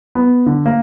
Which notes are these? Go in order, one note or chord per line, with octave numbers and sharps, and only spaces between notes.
B3
D3
A#3